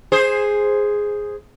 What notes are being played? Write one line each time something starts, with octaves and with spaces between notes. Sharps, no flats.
G#4 C5